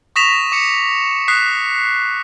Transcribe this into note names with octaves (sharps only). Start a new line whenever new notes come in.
C#6 D#6 A#6 B6 E7 F7
D6 C#7
D#6 F#6 B6 C7